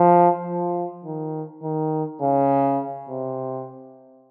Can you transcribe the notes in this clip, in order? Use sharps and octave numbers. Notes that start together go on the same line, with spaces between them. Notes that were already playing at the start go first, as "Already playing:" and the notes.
Already playing: F3
F3
D#3
D#3
C#3
C3